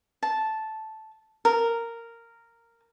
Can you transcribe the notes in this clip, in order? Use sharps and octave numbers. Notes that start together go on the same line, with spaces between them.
A5
A#4